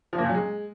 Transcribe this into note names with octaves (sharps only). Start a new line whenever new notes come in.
F3
A#3
A#2
F#3
G#3